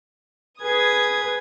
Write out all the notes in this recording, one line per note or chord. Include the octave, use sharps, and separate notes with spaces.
G#4 B4 D#6 G#6